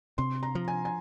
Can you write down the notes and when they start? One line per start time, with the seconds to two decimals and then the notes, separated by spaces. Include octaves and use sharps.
0.18 C3 C6
0.43 A#5
0.55 F3
0.68 G#5
0.85 G#5